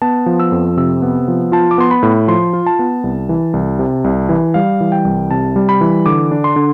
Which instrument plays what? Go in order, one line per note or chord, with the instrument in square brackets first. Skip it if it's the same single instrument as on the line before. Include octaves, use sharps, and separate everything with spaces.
[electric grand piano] B3 A5
F3
E6
F2
C3 E6
B3
F3
F4 A5
D6
B3 C6
B5
A2
F3 C6
F4
A5
B3
C2
E3
C2
C3
C2
E3
G3 F5
E3
G5
C2
C3 A5
G3
B5
E3
D3 D6
D4
C6
D3